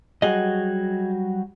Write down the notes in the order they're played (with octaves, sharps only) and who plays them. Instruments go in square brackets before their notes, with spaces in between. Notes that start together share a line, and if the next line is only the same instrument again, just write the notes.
[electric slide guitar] F#3 G3 F#4 [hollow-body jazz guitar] G#4 D#5